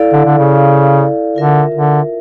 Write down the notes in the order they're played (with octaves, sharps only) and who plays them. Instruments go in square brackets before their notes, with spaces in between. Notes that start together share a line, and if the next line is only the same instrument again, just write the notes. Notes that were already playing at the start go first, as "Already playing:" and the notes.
Already playing: [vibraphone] E4 A4 D5 F5
[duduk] D3
D3
C#3
[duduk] D3 [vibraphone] F4 A#4 E5
[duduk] D3